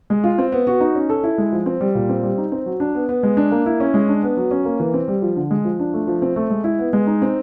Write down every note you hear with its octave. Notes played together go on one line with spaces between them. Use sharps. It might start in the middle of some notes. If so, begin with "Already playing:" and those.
G#3
F4
C4
B3
F#4
D#4
C#4
A4
E4
G#3
F3
C4
G3
A#2
C4
G3
D#4
C4
F#3
D4
B3
B3
G#3
D4
A#3
E4
C#4
G#3
D4
B3
F#3
C#4
A#3
E3
C4
G3
F3
D3
G#3
F3
D4
A3
F3
C4
A3
G#3
E4
B3
G#3
D#4
C4